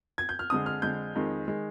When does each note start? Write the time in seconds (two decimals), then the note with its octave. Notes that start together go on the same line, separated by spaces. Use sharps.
0.18 G#6
0.29 G6
0.39 F6
0.50 F2 D3 G#3 D#6
0.66 F6
0.82 F2 D3 G#3 G6
1.15 F2 D#3 G#3
1.48 D#3 G#3